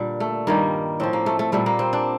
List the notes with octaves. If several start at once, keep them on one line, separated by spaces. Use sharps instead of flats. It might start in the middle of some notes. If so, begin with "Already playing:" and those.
Already playing: A#2 D3 G3 D4
A3
G2 D#3 G3 A#3
A2 F3 C4
A#3
A3
A3
A#2 G3 A3
A#3
C4
D4